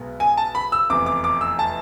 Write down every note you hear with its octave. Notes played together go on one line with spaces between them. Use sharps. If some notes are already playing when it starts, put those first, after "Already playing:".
Already playing: B1 B2 G#3 B3
G#5
A5
B5
E6
F1 E2 C3 D6
D6
D6
E6
A5